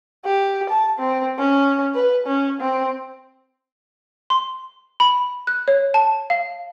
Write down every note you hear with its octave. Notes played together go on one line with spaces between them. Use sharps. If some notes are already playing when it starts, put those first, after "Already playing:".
G4
A5
C4
C#4
B4
C#4
C4
C6
B5
F#6
C#5
A5
F5